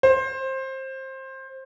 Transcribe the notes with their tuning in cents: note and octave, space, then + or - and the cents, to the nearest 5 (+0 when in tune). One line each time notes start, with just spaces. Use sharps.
C5 +20